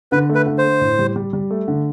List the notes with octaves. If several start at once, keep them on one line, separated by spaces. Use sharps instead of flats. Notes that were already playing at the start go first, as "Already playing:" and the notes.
D3 B4
A3
B4
D3
C5
A3
A2
G3
G3
G3
A3
D3